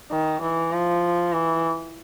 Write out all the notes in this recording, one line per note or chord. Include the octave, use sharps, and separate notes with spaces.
D#3
E3
F3
E3